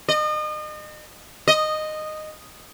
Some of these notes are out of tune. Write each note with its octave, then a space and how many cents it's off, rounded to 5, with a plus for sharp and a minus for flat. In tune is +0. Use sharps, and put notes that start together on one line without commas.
D#5 -35
D#5 -10